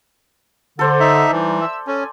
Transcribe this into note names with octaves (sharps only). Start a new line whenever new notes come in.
D3 A4 C5 D5
D#4 E5
E3 G3 D#4
E5 E6
C#4 A4 G#5